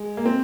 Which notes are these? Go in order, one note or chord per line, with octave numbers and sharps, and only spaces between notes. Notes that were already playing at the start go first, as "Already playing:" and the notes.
Already playing: G#3
A#3
C4